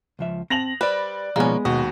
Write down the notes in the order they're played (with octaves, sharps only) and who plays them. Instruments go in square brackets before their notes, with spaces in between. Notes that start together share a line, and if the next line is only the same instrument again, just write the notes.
[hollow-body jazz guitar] C#2 F3 E5
[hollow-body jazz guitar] C4 A5 [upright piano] A#6 F7 F#7
[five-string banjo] G3 B4 [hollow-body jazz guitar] C5 [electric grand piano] D5 F#6
[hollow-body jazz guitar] B2 D#3 F3 [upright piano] G#3 B3 [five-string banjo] A#3 C#4
[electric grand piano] D#2 F#4 [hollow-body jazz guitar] B2 [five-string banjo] D#5